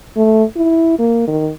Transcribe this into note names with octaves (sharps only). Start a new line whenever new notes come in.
A3
E4
A#3
D#3